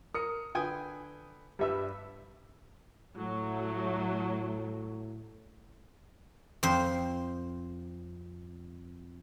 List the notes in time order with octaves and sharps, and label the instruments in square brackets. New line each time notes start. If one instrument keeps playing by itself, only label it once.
[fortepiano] A#4 [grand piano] D#6 C#7
[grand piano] D3 B4 [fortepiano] G5 G#5 D#6
[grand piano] G2 B4 E6 [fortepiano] G3 E5
[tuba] A2 [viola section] F#3 A3
[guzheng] F2 C5